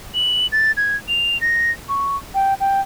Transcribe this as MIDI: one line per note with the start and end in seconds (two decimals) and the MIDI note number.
0.14 0.47 102
0.52 0.72 93
0.77 0.96 92
1.08 1.40 101
1.41 1.71 94
1.89 2.16 85
2.34 2.54 79
2.60 2.80 79